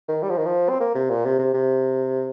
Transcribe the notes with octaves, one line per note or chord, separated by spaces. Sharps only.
D#3
G3
F3
D#3
F3
C4
A#3
C3
A#2
C3
C3
C3